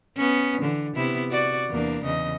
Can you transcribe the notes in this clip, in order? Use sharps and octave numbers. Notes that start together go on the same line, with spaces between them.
B3 C#4
D3 E3
C3 B3 E4
F#4 D5
E2 A#3 D4
E2 C#3 D#5